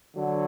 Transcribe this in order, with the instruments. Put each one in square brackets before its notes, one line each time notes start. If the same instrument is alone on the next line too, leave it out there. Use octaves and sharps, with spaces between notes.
[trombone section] D3 F#3